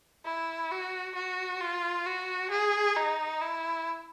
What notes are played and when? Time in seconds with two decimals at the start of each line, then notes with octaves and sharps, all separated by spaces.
0.25 E4
0.71 F#4
1.15 F#4
1.61 F4
2.06 F#4
2.50 G#4
2.96 D#4
3.41 E4